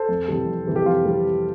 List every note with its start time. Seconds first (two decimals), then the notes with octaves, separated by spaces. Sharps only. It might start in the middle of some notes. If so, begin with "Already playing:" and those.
Already playing: A4 C5
0.09 F2
0.28 C3 E3 G3
0.47 F2
0.67 C3 E3 G3
0.76 G4
0.86 F2 F4
1.05 C3 E3 G3
1.25 F2